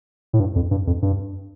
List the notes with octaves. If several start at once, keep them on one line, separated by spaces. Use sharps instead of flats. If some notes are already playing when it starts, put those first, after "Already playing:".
A2
G2
F2
G2
F2
G2